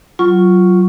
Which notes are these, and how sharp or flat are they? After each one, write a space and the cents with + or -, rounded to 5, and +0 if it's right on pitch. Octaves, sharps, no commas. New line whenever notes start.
F#3 +15 F4 +0 C#6 +0